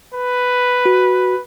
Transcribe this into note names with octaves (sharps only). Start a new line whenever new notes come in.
B4
F#4